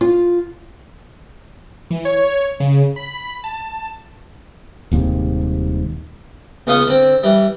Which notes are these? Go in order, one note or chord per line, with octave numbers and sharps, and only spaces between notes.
F4
E3
C#5
C#3
B5
A5
D#1 D#2 G#2 C3
C#2 B3 C#4 F5 C6 D#6
D3 C4
E3 G3